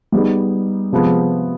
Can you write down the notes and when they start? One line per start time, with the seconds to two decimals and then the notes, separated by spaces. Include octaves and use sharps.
0.12 G3 B3 D#4 G#4
0.92 C3 F3 G#3 B3